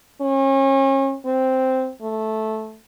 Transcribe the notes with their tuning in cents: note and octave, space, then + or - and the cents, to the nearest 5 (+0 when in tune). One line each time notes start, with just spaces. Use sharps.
C#4 -35
C4 -5
A3 -10